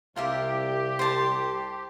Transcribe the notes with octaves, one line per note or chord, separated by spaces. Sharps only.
C2 F4 G4 A#4 E5
C5 A5